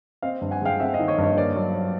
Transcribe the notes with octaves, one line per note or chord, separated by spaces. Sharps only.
C4 D#5 F5
G2
F#5 G#5
G#3 F5 G5
C4 E5 F#5
D#5 F5
D#3
C#5 D#5
G2
C#5 D#5
A#3 C5 D5
F#3
F#3